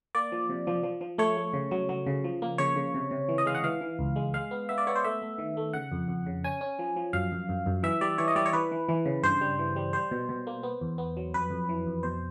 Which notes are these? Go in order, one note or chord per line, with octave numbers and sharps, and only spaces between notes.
A#3 D5
F3
C3
F3
F3
F3
A3 C#5
A3
C#3
F#3
F#3
C#3
F3
A#3
C#3 C#5
C#3
C3
C3
E3
D#5
G#3 F5
F#5
E3 F5
E3
C#2
G#3
G#3 F5
B3
B3 E5
D5
B3 C#5
C5
A3 E5
A3
D#3
A3
C#3 F#5
F2
F2
C#3
C#4 G#5
C#4
F3
F3
F#2 F5
F#2
F#2
F#2
E3 E5
G3 D5
E3 C#5
D#5
G3 D5
C#5
E3 B4
E3
E3
C#3
G2 C5
G3
E3
G3
G3 C5
B2
B2
A#3
B3
E2
B3
F#3
F2 B4
F2
E3
F2
B2 C5